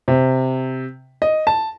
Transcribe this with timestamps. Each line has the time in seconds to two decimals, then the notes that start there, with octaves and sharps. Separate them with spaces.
0.08 C3
1.22 D#5
1.47 A5